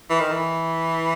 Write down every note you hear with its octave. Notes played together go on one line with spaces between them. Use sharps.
E3
D#3
E3